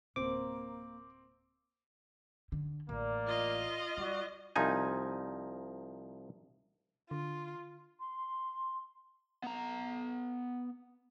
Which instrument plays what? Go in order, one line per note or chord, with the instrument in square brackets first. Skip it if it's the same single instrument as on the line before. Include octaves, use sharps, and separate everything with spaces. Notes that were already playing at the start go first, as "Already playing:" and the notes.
[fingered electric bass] D1 C3 [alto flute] A#3 [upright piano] C4 [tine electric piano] D6
[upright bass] D3
[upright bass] A1 [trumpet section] A#3 D5
[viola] F4 D#5
[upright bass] G3 [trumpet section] F#4 D5
[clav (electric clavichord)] C2 F3 D#4 G#5
[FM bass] D3 [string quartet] F4
[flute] C6
[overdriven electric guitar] B3 A#5